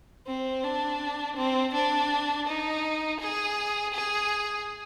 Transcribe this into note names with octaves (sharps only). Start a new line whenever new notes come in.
C4
D4
C4
D4
D#4
G#4
G#4